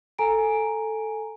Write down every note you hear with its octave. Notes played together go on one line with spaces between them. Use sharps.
A4 G#5 A#5 D7